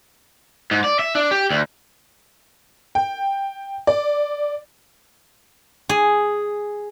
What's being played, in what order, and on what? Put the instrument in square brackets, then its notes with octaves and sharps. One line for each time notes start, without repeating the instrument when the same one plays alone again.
[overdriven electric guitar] G#2
D5
E5
D4
G4
D2
[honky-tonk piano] G5
D5
[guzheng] G#4